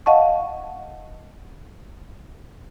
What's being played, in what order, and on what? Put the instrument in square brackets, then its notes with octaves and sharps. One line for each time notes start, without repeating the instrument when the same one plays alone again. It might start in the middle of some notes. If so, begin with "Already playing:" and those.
[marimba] D#5 F5 F#5 A5 C#6